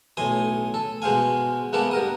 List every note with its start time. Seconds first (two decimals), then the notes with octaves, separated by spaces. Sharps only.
0.17 B1 A2 G#5 C6 D#6
0.74 A4
1.02 B2 G#3 C5 F5 G#5
1.73 G#3 A#3 B3 A4 E5 D6
1.91 G2 A#4 D#6